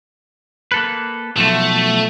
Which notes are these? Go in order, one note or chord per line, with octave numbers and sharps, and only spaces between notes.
A#3 A4 B4
B1 F3 A3 F#4